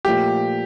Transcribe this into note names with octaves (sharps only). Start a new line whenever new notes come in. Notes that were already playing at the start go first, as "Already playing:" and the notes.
A#2 F3 A3 G4